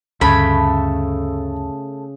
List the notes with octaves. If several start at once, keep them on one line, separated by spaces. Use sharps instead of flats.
D2 G2 C#3 A3 A4 B5